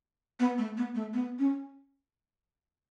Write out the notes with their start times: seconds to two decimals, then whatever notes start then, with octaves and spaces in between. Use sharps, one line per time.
0.40 B3
0.58 A3
0.77 B3
0.95 A3
1.14 B3
1.39 C#4